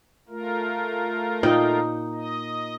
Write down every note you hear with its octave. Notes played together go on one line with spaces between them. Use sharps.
A3 F4 A#4
A#2 D#4 G5
D#5